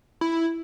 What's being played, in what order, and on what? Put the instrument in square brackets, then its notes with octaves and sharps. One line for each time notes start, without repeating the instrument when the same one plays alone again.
[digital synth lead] E4